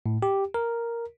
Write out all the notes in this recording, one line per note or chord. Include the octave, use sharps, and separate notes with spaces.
A2
G4
A#4